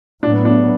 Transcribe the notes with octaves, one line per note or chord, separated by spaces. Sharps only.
A2 F#3 B3 D4
D4